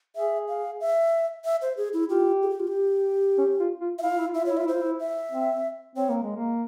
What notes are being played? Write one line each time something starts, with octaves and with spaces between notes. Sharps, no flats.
G#4 E5
F5
E5
E5
C5
G#4
E4
F4 G4
G#4
G4
F4
G4
C#4
F4
F4
E5
E4 F5
F4
E4
F4
E4 E5
F4
E4 C#5
F4 E5
E4 C5
F4
E4
E5
C4
C4 C#5
A#3
G#3
A#3